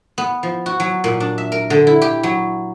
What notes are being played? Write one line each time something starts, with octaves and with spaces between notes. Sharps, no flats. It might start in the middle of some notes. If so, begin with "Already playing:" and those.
B3
F3
F#4
F#3
A#2
D4
E5
A#4
D3
E4
G4
F#3